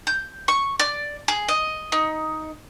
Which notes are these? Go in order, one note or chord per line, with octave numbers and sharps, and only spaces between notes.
G6
C#6
D5
G#4
D#5
D#4